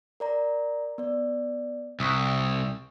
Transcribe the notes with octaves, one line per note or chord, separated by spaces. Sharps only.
A#4 D5 A#5
B3 D5
C2 C#6 D#6 E6